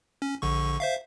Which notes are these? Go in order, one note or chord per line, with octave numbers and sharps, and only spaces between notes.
C#4
A#1 D3 C#6
C5 E5 F5